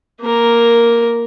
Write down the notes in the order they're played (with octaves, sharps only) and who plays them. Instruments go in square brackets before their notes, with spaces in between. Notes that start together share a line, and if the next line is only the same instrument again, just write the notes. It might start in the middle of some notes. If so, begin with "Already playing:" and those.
[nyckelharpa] A#3 A#4